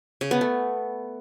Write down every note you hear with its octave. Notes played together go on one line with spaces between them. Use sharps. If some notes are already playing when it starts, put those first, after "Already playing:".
C#3
B3
A3